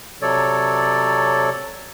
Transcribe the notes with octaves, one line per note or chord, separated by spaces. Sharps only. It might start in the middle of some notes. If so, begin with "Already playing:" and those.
C3 F#3 A4 C#5 D5